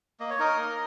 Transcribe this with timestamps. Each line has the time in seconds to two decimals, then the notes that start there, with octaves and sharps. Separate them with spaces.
0.20 A#3 D#5
0.30 C#5
0.39 D#4 A#4 D#5
0.58 A#3